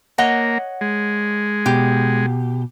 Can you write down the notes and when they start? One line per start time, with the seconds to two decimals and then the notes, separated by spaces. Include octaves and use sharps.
0.18 A#3 C#5 D#5 F#5
0.81 G#3
1.66 B2 G4